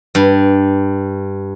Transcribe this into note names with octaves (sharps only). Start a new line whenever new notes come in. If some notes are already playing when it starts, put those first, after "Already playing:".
G2